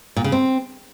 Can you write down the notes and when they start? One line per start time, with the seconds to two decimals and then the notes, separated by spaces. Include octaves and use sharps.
0.16 A#2
0.24 C#3
0.32 C4